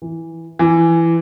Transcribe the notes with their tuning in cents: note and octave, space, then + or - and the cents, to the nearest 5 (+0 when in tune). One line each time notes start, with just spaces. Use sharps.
E3 -5
E3 +15